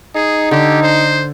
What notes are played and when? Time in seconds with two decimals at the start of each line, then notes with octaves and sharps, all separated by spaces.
0.15 D#4 G#4
0.51 D3 G4
0.83 C5